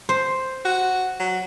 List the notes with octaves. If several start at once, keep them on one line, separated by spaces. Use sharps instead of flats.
C5
F#4
F#3